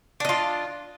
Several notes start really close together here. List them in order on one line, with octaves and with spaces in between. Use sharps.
D4 D#5 F4